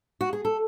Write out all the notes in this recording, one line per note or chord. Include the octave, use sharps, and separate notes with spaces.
F#4
G#4
A4